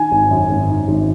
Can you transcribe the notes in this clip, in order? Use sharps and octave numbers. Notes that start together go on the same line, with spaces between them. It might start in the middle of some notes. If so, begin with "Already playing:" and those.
Already playing: D#3 G#5
G#1
F#2
G#1
D#3
G#1